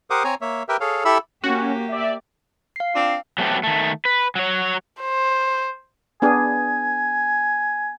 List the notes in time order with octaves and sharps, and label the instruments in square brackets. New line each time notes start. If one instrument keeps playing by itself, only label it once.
[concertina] G4 A#4 C5 F#5 D6 D#6
C4 C#5 G#5 A#5
A#3 C#5 E5
G4 A#4 B4 E5 G5
G#4 A4 C#5 F5
E4 G4 A4 E5 B5 E6
[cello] A#3 G4 [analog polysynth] C#4 [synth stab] F#4
[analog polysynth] D5 E5
[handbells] F5 C7
[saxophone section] C4 D4 F4
[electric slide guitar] F#3 A3 B3 C4 G4
D#3 A3
B4
F#3 C#5
[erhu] C5
[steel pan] B3 D4 G#4 [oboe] G#5